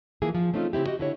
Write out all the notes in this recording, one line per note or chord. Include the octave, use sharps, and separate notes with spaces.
E3 F3 A#3 E4 G#4
F3
A3 C4 C#4 D#4 F4
C#3 C4 E4 G4
F#4 G4 D#5
D3 E4 C#5